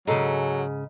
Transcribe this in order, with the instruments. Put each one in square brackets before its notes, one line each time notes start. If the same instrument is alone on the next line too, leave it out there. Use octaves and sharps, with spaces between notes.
[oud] G#2 C#3 [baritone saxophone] F#3 [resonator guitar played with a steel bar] G#4 A4 [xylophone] D#5 A#5